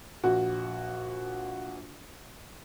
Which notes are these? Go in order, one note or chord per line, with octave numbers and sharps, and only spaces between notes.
A#1 F#4